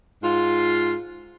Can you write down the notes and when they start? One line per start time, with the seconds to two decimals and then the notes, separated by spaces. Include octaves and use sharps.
0.23 G#2 F4